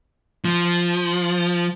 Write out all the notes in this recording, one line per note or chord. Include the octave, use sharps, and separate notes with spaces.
F3